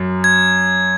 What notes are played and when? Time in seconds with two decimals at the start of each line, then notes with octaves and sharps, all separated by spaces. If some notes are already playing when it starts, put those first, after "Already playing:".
Already playing: F#2
0.24 G#6